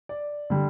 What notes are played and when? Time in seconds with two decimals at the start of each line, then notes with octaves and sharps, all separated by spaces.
0.09 D5
0.50 D3 G3